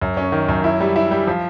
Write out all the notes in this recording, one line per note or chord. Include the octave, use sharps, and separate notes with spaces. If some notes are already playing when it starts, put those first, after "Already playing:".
F#2
C#4
D#3
F#2
E4
G3
E4
G3
F3